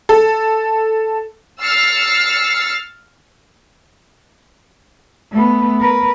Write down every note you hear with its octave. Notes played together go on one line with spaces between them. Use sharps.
A4
E6 F6 A6 C7 C#7
A3 B3
A#4 B4